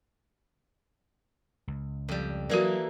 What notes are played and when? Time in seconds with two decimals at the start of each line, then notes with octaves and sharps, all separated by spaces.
1.68 C#2
2.09 F2 G3
2.50 E3 F#3 A#3 F#4 A4 D5